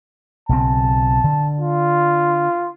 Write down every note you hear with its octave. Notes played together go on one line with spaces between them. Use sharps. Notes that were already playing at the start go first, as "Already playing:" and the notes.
B1 C#3 C4 A5
D3
F4